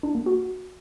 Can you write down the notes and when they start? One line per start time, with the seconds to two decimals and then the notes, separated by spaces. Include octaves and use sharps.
0.03 D4
0.15 A#3
0.26 F#4